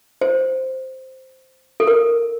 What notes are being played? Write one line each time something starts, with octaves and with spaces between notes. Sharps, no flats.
C5
A4
A#4